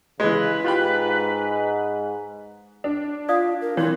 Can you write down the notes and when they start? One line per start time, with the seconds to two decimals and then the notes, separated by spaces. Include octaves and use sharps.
0.20 C#3 E3 G#3 B4
0.64 G#2 F4 G4 B5
2.84 D4
3.29 F4 D5 F5 D#6
3.61 A#4
3.77 E3 C4 C#5 C6